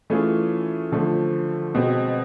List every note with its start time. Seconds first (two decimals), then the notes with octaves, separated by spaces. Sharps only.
0.10 E3 A3 C#4 F4 G#4
0.92 D3 F3 A3
1.75 B2 G#3 C4